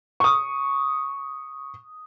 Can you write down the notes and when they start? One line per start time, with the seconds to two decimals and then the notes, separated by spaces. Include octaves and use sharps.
0.20 C#6 D#6